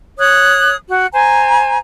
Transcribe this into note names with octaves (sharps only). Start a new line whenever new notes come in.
C#5 D#6 F#6
F#4
C5 G#5 A#5